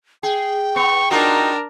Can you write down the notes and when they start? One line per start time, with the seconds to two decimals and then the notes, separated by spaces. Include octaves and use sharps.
0.23 G#4 G5
0.76 B3 C#6
1.11 B3 D4 D#4 F4 F#4 A#4